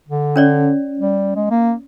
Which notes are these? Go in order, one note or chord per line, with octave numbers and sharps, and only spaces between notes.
D3
C#4 C#5 D5
G3
G#3
A#3